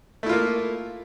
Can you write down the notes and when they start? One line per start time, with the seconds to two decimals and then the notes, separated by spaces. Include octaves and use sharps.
0.23 A3
0.26 E4
0.29 F4
0.32 A#3